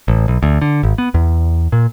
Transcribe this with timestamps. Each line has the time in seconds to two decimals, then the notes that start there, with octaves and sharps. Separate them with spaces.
0.08 A1
0.28 B1
0.43 D2
0.62 D3
0.83 G#1
0.98 B3
1.14 E2
1.72 A#2